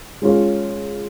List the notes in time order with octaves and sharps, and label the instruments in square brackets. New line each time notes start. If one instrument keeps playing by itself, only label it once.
[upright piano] G#3 C#4 F4 C#5